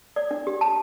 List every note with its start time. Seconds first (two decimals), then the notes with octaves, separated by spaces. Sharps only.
0.16 D5
0.31 D4
0.47 G4
0.61 A5